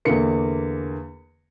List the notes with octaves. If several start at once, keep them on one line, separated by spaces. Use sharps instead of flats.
E2 D3 A#3 C#7